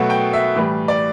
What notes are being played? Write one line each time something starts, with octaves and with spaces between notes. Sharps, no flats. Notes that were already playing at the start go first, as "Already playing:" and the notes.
Already playing: B2 F#3 A3 F#5
G5
E5
A2 E3 G3
D5